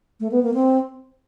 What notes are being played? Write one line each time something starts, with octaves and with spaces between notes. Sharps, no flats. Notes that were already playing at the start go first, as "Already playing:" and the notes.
A3
B3
A#3
C4